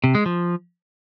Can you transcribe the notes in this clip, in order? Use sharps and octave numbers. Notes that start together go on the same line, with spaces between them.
C3
G#3
F3